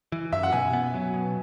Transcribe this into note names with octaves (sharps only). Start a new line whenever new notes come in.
E3
F#2 E5
F#5
B2 G#5
B3
F#3
B2